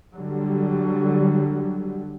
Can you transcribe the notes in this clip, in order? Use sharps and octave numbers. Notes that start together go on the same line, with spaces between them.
D3 F#3 G3